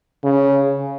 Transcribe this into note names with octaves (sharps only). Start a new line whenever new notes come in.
C#3